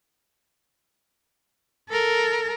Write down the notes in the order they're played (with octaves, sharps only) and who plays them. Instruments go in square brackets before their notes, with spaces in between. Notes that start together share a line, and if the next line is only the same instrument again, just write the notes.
[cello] A4 A#4